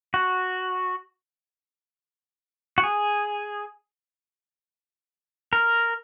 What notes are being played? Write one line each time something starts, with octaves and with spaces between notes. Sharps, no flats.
F#4
F#4
G#4
A#4